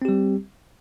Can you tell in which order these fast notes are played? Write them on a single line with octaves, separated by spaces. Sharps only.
C4 G4 G3